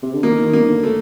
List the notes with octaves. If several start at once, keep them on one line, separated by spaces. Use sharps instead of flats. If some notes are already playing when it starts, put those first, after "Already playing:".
C3
D3
D#3 A#3
D#3
A#3
D3
A3